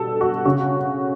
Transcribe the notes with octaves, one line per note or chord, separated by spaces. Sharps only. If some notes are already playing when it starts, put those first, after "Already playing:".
Already playing: B2 G3 A4
F#4
C#3 F#4